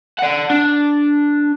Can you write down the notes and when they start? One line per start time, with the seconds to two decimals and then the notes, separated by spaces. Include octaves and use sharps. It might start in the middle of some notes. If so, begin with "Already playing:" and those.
0.19 D5 F#5
0.50 D4